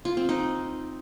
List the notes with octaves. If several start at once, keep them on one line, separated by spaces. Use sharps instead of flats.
F4
C4
D#4